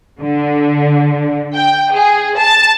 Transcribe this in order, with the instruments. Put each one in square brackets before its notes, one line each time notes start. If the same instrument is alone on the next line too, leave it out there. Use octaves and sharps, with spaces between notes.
[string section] D3
G5
G#4
A5